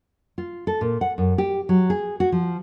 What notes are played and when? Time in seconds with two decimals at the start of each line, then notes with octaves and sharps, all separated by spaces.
0.38 F4
0.67 A4
0.81 A#2
1.01 F#5
1.18 F#2
1.38 G4
1.69 F#3
1.90 G#4
2.20 F#4
2.32 F3